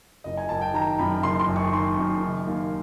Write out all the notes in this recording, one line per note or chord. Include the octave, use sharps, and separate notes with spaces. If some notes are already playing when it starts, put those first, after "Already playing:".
F#1 D#5
G#5
F#1 A5
G5
D#3 A#5
F#2 B5
F#1 C6
C6
F#1
C#6
D#3 C6
F#2
D#3
D#2